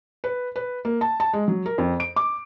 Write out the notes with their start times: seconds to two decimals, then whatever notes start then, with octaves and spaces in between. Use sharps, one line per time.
0.24 B4
0.56 B4
0.85 A#3
1.01 A5
1.20 A5
1.33 G#3
1.48 F#3
1.66 A#4
1.78 F2
2.00 D7
2.16 D6